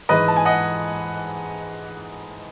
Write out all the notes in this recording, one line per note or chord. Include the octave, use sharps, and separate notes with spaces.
G#2 E3 G#3 B4 D#5
A5
G#5
D#5 F#5